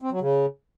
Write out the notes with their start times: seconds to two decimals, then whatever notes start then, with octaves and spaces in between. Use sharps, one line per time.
0.02 C4
0.11 F#3
0.21 C#3